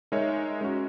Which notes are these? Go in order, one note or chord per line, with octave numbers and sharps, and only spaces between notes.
G#3 D#4 A#4 C#5 E5
G#3 C#4 F#4